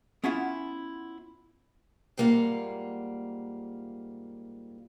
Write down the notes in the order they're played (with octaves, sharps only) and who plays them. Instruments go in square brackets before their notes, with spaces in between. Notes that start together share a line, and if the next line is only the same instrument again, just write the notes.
[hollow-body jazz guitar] B3 C#4 E4 F4 E5 F#5
[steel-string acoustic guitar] G#2 G3 A#3 F4 F#5